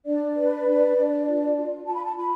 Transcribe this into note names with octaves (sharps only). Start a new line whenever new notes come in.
D4 D5
B4
D4
D4
F4
F4
F4 A5
B5
A5
F4 B5